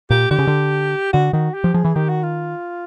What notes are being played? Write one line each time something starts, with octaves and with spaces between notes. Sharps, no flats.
A#2 G4
D3 G4
C#3
D3
D3 F#4
D#3 F#4
G4
F3
F3 G#4
E3
D#3 G4
F#4
F4